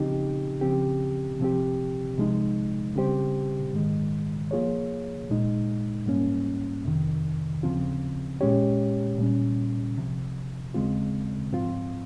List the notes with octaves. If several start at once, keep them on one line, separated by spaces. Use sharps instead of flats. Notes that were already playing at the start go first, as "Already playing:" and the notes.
Already playing: C#3 F3 C4 D#4 G4
C#3 F3 C4 G4
C3 F3 C4 G4
C2 C3 F3 G#3 D#4
C#3 G3 C4 G4 C5
G#2 D#3 G#3
F3 A#3 F4 G#4 C#5
C2 A#2 G#3 D#4
G#2 G3 A#3 C#4
F2 C3 D#3
D#2 C#3 F3 C4 F4
A#2 G#3 C#4 G4 C#5
A#2 G3 C#4
C2 C3 F3
D#2 C#3 G#3 C4 F4
G#2 F3 C4 F4